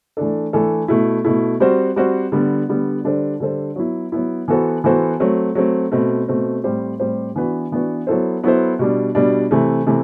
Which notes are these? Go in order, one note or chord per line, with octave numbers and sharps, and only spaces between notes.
E3 A3 D4 A4
E3 A3 D4 A4
B2 A3 E4
B2 A3 E4
G3 C4 F#4 C5
G3 C4 F#4 C5
D3 G3 B3
D3 G3 B3
D3 G3 D4 A4 C5
D3 G3 D4 A4 C5
F#3 B3 E4
F#3 B3 E4
E3 B3 F#4 A4 C5
E3 B3 F#4 A4 C5
F#3 A3 C4
F#3 A3 C4
B2 A3 C4
B2 A3 C4
A2 G3 C4 G4 C5
A2 G3 C4 G4 C5
E3 B3 D4 F#4 B4
E3 B3 D4 F#4 B4
F#3 B3 E4 A4 C5
F#3 B3 E4 A4 C5
B2 G3 D4
B2 G3 D4
C3 E3 A3
C3 E3 A3